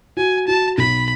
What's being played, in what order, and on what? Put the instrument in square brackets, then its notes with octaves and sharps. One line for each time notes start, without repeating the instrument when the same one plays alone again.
[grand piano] F#4 [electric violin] G#5
[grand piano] F#4 [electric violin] A5
[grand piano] B1 [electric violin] B5